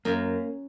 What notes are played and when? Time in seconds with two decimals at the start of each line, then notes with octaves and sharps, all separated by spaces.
0.05 F#2 A#3